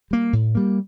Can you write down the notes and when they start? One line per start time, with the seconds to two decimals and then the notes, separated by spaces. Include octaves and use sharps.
0.11 G3 A#3
0.33 A2
0.55 G3 A#3